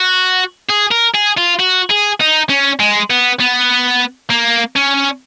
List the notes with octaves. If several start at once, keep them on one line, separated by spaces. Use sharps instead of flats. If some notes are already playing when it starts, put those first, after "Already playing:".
Already playing: F#4
G#4
A#4
G#4
F4
F#4
G#4
D#4
C#4
G#3
B3
B3
A#3
C#4